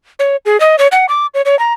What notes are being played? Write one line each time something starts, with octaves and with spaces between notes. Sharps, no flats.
C#5
G#4
D#5
C#5
F#5
D6
C#5
C#5
A#5